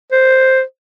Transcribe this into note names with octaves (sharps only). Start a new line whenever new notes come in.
C5